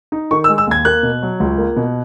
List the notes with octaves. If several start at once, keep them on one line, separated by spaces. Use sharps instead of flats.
D#4
D#3 C#6
E6
G#3
E6
D#2 G#6
A#3 F#6
B2
F#3
C#2
A#3
B2